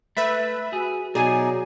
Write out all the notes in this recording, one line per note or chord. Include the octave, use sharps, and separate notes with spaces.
A3 B4 E5 B5
F#4 G#4
B2 F#3 D#4 G#4 D5 G#5